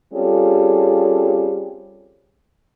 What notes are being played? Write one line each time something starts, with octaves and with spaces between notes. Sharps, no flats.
G3 C4 C#4 F4 G#4 A4